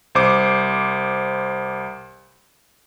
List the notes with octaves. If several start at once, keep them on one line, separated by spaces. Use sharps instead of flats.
C2 C5 D6